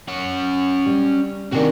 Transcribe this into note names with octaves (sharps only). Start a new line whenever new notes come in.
C#4 F#5
G3
C3 D#3 D4 F#4 G#4